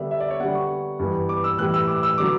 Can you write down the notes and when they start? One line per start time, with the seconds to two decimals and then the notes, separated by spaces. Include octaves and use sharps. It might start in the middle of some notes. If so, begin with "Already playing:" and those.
Already playing: D3 G3 B3 D4 E5
0.11 E5
0.20 D5
0.31 C#5
0.40 D3 G3 B3 F#5
0.55 C#6
0.99 G2 E3 B3
1.29 D6
1.44 E6
1.58 A2 E3 G3 F#6
1.74 E6
1.88 D6
2.03 E6
2.18 D3 F#3 B3 D6